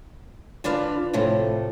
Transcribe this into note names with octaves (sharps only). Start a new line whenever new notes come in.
D3 D4 F4 B4 F5
A2 C3 F3 A3